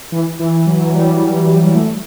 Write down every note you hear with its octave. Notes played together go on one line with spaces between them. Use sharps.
E3
E3
F#3
G3
A3